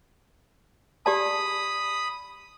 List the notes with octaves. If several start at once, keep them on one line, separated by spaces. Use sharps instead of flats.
G4 D5 A5 B5 D#6